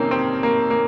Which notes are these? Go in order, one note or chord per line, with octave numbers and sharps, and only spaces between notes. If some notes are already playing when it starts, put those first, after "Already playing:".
Already playing: F2 C3 D#3 A#3 C4 C#4 D#4
C4
A#3
A#3